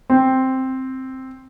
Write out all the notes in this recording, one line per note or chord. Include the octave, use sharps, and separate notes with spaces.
C4